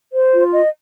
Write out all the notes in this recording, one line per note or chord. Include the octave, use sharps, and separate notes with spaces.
C5
F4
D#5